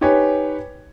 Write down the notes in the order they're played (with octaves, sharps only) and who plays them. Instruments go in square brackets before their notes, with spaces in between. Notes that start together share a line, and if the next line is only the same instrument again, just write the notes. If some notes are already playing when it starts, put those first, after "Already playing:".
[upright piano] D#4 G4 B4 C#5 G#5